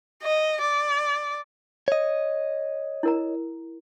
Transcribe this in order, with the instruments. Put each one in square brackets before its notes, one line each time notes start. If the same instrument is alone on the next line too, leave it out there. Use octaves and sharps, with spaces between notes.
[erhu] D#5
D5
[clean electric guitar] C#5 D#5
[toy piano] E4 A#4 A#5